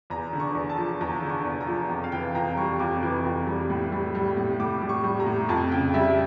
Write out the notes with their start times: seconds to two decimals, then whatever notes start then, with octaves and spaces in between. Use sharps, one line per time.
0.10 E2 A#5
0.33 D3
0.40 C#6
0.55 E2
0.70 A5
0.78 F3
1.01 E2 A#5
1.22 D3
1.30 C#6
1.45 E2
1.61 A#5
1.67 F3
1.89 F2
2.04 F5
2.12 E3 G5
2.35 F2 A#5
2.57 G3 C#6
2.80 F2 D6
3.03 E3
3.25 F2
3.47 G3
3.70 A2
3.92 G3
4.15 G3
4.37 A2
4.60 A2 D6
4.82 G3
4.89 C#6
5.04 G3
5.20 A#5
5.27 A2
5.49 F2 A5
5.71 C#3 G5
5.94 G3 E5